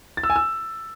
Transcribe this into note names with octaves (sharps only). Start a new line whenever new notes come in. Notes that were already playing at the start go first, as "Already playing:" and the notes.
A6
E6
G#5
E6